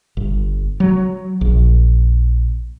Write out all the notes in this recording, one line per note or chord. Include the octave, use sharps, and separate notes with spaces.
G1
F#3
A#1